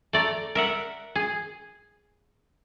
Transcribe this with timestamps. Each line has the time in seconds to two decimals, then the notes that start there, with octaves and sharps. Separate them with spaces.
0.13 A3 D5 A#5
0.55 A#4 E5 F#5
1.16 G#4